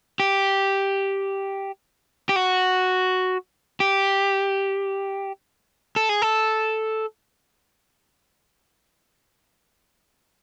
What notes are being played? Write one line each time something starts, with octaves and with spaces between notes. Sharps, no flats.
G4
G4
F#4
G4
A4
G#4
A4